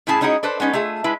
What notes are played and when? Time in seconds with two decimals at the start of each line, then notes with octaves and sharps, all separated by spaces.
0.07 A2 C#4 E4 G#4 A5
0.21 G#3 C#4 D#4 E4 F#4 G#4
0.43 D4 A4 B4 C5
0.60 G#3 B3 C#4 D#4
0.73 A3 F4 G#4 E5
1.04 G#3 E4 B4